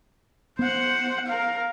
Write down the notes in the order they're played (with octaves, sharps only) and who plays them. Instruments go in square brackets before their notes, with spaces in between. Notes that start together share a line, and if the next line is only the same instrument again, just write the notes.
[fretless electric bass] B3 [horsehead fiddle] C5 F#5
[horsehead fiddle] A#4 F5